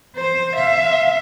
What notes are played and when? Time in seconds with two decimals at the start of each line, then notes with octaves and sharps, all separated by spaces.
0.16 C5
0.54 E5 F5